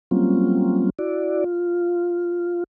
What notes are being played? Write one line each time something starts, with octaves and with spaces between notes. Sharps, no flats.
F#3 G3 A#3 C4 C#4 F4
E4 F#4 D5
F4